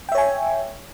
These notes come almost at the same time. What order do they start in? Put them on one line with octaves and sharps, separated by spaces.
G5 E5 C#5 G#5